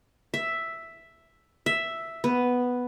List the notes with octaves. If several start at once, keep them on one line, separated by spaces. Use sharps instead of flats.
E5
E5
B3